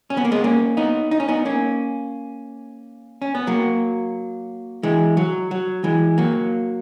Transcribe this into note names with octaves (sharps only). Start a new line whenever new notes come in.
C#4
B3
A#3
G#3 B3
A#3 C#4
B3 D#4
D#4
C#4
B3 D#4
A#3 C#4
C#4
B3
F#3 A#3
E3 G#3
F#3
F#3
E3 G#3
F#3 A#3